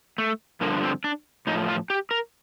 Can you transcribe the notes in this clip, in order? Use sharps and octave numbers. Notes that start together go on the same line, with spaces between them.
A3
G2 D3 F3 A#3
C4
D4
A2 F3 D#4
F4
G4
A#4